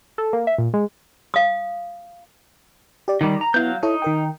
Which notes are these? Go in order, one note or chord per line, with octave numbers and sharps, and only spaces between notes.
A4
A#3
E5
A#2
G#3
F5 D#6
G4 D5
D#3 G3 D#4
A#5
F#3 B3 E4 F5 G6
D#4 E4 A4 C#5
D#3 A#4 G5